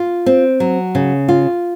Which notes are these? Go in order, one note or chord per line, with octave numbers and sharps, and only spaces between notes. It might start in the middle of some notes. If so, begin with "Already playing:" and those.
Already playing: F4
C4
F#3
C#3
F4